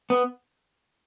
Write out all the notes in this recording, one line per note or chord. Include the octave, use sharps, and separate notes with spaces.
B3